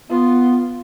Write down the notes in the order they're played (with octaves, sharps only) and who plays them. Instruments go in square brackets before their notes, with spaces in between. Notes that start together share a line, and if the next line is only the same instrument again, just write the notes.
[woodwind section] B3 [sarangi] F4